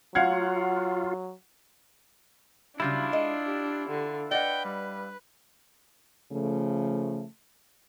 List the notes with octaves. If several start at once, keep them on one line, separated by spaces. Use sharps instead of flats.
F#3 F4 F5 F#5 G#6
C#3 F#3 G3 D4 E4 F4
G#3 D#5
G4
D3
B4 D5 D#5 F#5 G5
G3
C#3 F3 A3